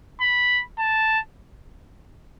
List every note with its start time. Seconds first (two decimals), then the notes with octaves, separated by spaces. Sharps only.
0.21 B5
0.79 A5